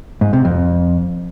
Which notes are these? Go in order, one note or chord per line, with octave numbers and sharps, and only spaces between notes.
G#2
C3
F2